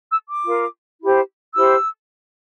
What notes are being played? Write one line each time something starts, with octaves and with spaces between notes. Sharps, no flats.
E6
D6
F4 A#4
E4 G4 C5
E4 G4 C5 E6